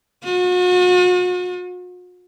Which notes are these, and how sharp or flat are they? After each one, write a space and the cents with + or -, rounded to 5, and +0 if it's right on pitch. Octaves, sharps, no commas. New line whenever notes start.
F#4 -40